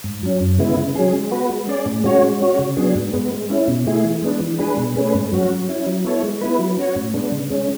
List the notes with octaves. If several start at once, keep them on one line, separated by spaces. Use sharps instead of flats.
G#2
F#3 C#4
F#2
C#3 G#3 B3 E4
C#3
F#3 C#4 G#4
G#3
B3 F#4 B4
G#3
C#4 G#4 D5
A2
G#3 C#4 F#4 C#5
G#3
C#4 F#4 C#5
C#3
F#3 B3 D4 G#4
G#2
G#3 B3
G#3
C#4 E4
B2
A3 E4 G#4
E3
G#3 B3 D4
E3
G#3 D4 G#4 B4
B2
A3 C#4 G#4 B4
G#2
F#3 C#4 F#4
F#3
C#4 E4
F#3
B3 E4 A4 C#5
G#3
B3 E4 B4
F#3
C#4 F#4 C#5
A2
G#3 B3 D4
C#3
G#3 C#4